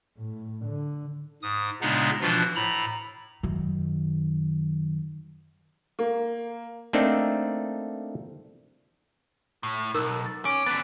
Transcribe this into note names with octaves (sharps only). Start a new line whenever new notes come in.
A2
D3
G#2 D#6
A#2 C#3 G#3 B3 D4 D#4
B2 E3 F3 D4 F4
A2 A#5 B5
F#2 D#3
A#3
A3 A#3 C4 D4 D#4 A4
A2
B1 D#4 A#4 E6
A6
C#4 D6 D7
D3 B3 A6 B6